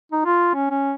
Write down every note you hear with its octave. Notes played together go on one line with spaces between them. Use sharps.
D#4
F4
C#4
C#4